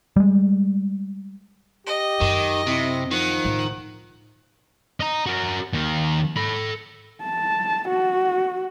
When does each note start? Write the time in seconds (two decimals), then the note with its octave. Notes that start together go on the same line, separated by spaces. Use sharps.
0.16 G3 G#3
1.86 G4 D#5
2.21 F#2 D#3
2.67 C3 E4
3.11 D#3 F3 F#5
3.45 A2 C#3
5.00 D#5 A#5
5.26 F#4 A#4
5.73 D#2 D#3
6.37 A4 B5
7.23 A5
7.89 F#4